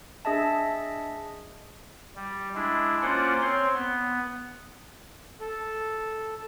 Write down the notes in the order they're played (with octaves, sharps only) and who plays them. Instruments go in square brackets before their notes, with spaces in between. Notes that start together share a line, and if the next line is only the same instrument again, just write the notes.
[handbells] D4 G#4 D#5 E5 A5
[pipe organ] G3
G#3 D4 E4
A#3 C#4 F4 C5 D5 F#5
C4 C5 C#5 C6
B3
[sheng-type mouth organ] A4